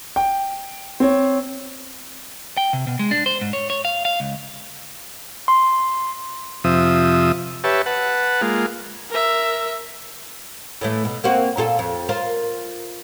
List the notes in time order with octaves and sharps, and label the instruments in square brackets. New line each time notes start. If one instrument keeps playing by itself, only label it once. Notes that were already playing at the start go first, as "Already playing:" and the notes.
[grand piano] G5
C4 C#5
[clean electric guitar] G5
C3
B2
G#3
D4
C5
G#2
C#5
C#5
F5
F5
C#2
[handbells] C6
[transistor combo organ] F2 C3 F3 E5 D#6
G4 B4 C#5 E5 A5
B4 F#5 A5
G#3 A#3 F4
[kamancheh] A#4 E5
[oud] A2 E3 A3
B2
A#3 C4 F#4
A#2 F4 A4
F2
F4 A#4 C5